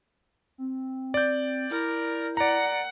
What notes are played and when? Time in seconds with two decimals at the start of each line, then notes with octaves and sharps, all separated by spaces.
0.58 C4
1.14 D5 G6
1.71 E4 A#4
2.37 D5 F#5 A#5